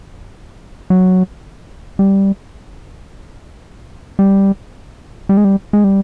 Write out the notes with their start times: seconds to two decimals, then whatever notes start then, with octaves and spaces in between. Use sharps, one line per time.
0.90 F#3
1.99 G3
4.19 G3
5.29 G3
5.37 G#3
5.45 G3
5.73 G#3
5.84 G3